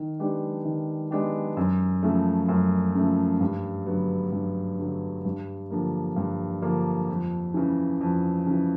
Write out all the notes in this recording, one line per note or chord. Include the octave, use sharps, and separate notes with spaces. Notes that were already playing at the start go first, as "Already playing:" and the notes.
Already playing: D#3
G#3 B3 D4 G4
D#3
G#3 B3 D4 G4
F#2
C#3 F3 A3
F#2
C#3 F3 A3
G2
D3 F#3 B3
G2
D3 F#3 B3
G2
D3 F3 A#3
G2
D3 F3 A#3
F2
C#3 E3
F2
C#3 E3